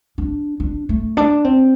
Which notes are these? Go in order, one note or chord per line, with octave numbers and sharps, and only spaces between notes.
D4
D4
A3
D4
C4